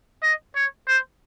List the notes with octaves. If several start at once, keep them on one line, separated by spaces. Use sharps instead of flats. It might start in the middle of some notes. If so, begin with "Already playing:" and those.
D#5
C#5
C5